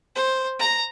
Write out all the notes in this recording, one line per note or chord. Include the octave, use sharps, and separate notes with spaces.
C5
A#5